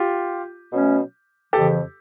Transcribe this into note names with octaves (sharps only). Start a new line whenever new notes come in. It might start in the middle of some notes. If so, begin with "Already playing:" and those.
Already playing: F4 G4
B2 F#3 A3 C#4
F2 C#3 E3 G4 A4